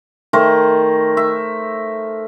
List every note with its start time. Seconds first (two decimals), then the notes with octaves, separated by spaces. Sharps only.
0.33 D#3 A3 A#4 C5
1.17 E5